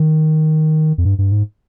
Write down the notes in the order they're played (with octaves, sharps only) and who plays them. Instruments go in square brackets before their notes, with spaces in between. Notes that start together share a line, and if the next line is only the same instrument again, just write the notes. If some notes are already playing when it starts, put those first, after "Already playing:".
Already playing: [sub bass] D#3
F2
G2
G2
G#2